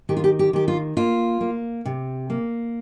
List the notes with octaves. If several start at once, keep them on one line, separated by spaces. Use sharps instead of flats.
D#3 G4
F4
G4
G4
D#3 G4
F4
A#3 F4
A#3
C3
A#3